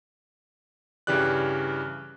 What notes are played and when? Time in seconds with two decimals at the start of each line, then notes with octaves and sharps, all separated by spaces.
1.07 G2 C#3 E3 G4 D5 F#6